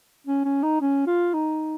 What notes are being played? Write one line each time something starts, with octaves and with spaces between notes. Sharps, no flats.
C#4
C#4
D#4
C#4
F4
D#4